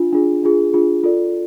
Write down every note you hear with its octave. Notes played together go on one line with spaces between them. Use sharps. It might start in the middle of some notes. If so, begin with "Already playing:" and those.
Already playing: D4 F4
D4 F4 G#4
D4 F4 G#4
D4 F4 G#4
F4 A4 D5